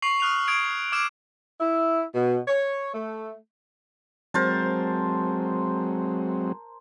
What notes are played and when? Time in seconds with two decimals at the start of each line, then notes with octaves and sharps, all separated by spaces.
0.02 C#6 C7 F7 F#7
0.20 D#6 F6 F#6 C7 F7
0.47 D#6 G#6 D7 F7
0.92 D6 E6 F6 G#6 D7 E7
1.60 E4
2.15 B2
2.48 C#5
2.94 A3
4.34 F#3 G#3 C4 A#4 C5 A5